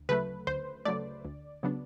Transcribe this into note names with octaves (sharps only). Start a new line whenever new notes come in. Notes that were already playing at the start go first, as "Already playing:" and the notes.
Already playing: D2
C#3 F#3 A3 B4
D2 C5
C#3 F#3 A3 D5
D2
C#3 F#3 B3 D4